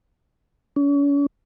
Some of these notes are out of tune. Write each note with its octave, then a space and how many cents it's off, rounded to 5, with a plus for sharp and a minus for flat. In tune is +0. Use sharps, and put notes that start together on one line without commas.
C#4 +40